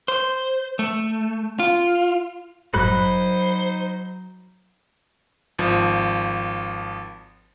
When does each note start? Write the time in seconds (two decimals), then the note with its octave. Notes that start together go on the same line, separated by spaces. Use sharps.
0.08 C5
0.79 A3
1.59 F4
2.74 G1 F#2 A2 F#3 D#4 C5 B5 F#6
5.59 G#1 F3